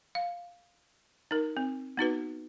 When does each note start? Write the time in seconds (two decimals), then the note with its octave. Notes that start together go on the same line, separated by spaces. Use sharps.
0.15 F5
1.31 D#4 A#4
1.57 C4
1.97 B3 D#4 F#4 B4